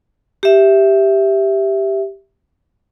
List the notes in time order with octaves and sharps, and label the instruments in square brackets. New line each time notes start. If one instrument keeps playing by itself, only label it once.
[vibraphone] G4 E5